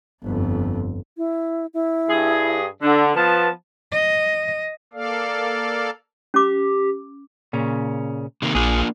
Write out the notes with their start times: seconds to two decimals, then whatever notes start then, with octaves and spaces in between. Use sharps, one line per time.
0.22 G1 F2
1.17 E4
1.74 E4
2.09 G2 G#4
2.82 D3 D4
3.15 F3 B3 B4 A5
3.92 D#5
4.93 A#3 A4 D5 F5
6.34 C#4 G4 D6
7.53 A#2 C#3 C#4
8.42 C3 D#3 A#3
8.55 A#1 A#3 D4 F4 G#4